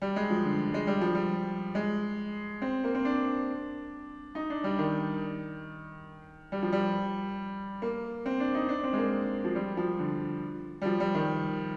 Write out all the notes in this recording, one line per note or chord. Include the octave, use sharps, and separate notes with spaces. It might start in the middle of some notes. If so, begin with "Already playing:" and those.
G3
G#3
F3
D3
G#3
G3
F3
G3
G#3
C4
A#3
C4
D4
D#4
D4
G3
D#3
G3
F3
G3
A#3
C4
D4
D#4
D4
C4
G#3
A#3
F3
G3
F3
D3
G3
F3
G3
D#3